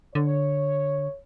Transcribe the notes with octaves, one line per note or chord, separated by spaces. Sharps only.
D3 C#5